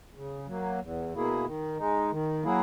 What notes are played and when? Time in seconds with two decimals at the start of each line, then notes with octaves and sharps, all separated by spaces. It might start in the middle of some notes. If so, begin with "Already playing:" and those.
0.14 C#3
0.47 F#3 A#3
0.81 E2
1.13 B2 A#3 E4 G#4
1.45 D#3
1.78 G#3 D#4
2.11 D#3
2.43 F#3 A#3 E4 G#4